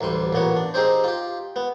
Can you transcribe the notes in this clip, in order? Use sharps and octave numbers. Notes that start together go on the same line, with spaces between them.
A1 D2 G3 C6
A1 A#2 B3 C#5
D4
C4 D#4 G4 G#4 C5
F4 G4
B3